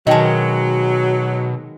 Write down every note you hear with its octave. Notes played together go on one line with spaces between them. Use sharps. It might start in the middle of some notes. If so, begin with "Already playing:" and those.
B2 D#3 F#3 G#3 D#5 G5 A5